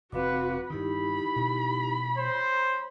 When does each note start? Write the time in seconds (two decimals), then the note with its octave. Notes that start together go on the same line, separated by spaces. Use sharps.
0.12 F1 F2 C4 F#4 B4 F5 D6
0.70 G2 D#3 D#4 E4 G4 B5
1.36 B2 A3
2.18 C5 C#5